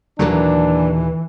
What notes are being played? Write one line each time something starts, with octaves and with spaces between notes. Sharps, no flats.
D#2 A#2 D3 E3 F#3 A#3 D4